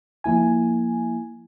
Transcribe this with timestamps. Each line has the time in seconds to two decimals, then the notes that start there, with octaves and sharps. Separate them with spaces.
0.24 F3 A#3 E4 G#5